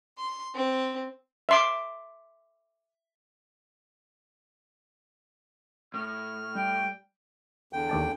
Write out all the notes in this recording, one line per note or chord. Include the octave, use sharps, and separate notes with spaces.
C6
C4
E5 C6 D6
A2 F6
G3 G5
E2 D3 G5
D#2 D5 A5